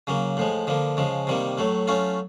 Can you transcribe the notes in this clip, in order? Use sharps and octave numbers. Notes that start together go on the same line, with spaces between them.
C#3 F#3 A#3
A2 F3 G#3
D3 F3 A#3
C#3 F3 G#3
C3 D#3 G3 A#3
A2 F#3 A3
F#3 A3 C#4 F4